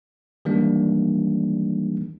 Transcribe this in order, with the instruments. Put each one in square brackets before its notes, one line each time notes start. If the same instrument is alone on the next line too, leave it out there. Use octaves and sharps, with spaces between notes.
[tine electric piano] D#3 E3 G3 G#3 A#3 D4